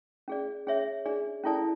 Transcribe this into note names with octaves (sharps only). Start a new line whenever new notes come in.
C#4 G#4 D5
C#4 G#4 C#5 E5
D4 G#4 D5
C#4 E4 A4 D5 A5